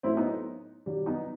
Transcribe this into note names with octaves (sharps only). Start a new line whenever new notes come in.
A2 F#3 C4 E4
B3 D#4
C3 D#3 F#3 G3
B3 D#4